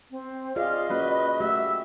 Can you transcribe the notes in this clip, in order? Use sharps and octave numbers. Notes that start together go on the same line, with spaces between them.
C4
F4 G#4 D5 D#5 F5
A#3 C#4 F#4 B4
A3 F#4 G4 E5